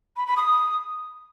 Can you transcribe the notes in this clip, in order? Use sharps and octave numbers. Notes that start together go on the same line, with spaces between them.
B5
B5
D#6